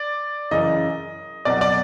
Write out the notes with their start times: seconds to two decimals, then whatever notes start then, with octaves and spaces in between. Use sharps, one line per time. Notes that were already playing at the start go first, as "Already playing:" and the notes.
Already playing: D5
0.51 F#2 C#3 E3 D#5
1.45 C2 B2 F#3 D5
1.61 D5